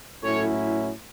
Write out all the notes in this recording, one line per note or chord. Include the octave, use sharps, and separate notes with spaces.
A2 F#3 C#4 E4 A4 C#5